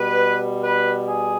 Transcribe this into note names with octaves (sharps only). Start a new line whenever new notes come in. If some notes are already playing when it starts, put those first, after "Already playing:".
Already playing: B2 G3 B4
B4
G#4